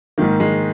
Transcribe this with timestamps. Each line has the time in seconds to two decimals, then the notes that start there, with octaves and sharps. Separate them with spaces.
0.18 G#2 D#3 A#3
0.40 G#3